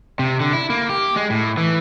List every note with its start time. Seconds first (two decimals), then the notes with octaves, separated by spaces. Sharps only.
0.19 C3
0.40 D3
0.53 E4
0.70 A#3
0.90 G4
1.16 G#3
1.30 A2
1.58 E3